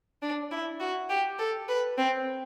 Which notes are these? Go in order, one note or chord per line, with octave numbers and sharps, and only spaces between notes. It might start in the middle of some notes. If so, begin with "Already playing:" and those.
D4
E4
F#4
G4
A4
B4
C4